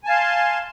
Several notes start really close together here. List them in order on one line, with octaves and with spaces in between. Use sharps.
G#5 A5 F5 C6